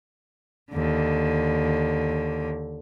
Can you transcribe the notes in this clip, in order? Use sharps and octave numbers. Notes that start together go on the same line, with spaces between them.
D#2 D3